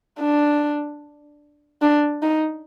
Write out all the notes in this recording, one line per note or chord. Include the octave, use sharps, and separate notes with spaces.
D4
D4
D#4